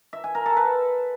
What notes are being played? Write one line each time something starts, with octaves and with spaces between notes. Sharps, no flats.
E5
G#5
A#4
A4
B4